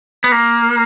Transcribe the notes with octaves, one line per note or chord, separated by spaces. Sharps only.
B3
A#3